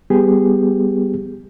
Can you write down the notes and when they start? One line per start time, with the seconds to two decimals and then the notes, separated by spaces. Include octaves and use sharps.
0.10 G3 B3 G4 G#4